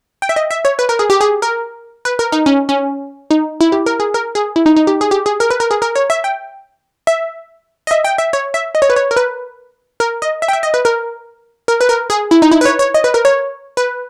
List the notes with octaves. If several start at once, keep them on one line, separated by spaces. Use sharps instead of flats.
G5
E5
D#5
E5
C#5
B4
A#4
G#4
G4
G#4
A#4
B4
A#4
D#4
C#4
C#4
D#4
E4
G4
A#4
G#4
A#4
G#4
E4
D#4
D#4
G4
G#4
G4
G#4
A#4
B4
A#4
G#4
A#4
C#5
E5
G5
E5
D#5
E5
G5
E5
C#5
E5
D#5
C#5
B4
C#5
A#4
B4
A#4
D#5
E5
G5
E5
D#5
B4
A#4
A#4
B4
A#4
G#4
E4
D#4
E4
B4
C#5
C#5
D#5
B4
A#4
C#5
B4